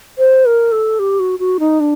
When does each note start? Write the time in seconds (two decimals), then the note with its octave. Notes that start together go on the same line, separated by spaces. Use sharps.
0.18 C5
0.46 A#4
0.72 A4
0.99 G4
1.20 F#4
1.39 F#4
1.60 D#4
1.80 D4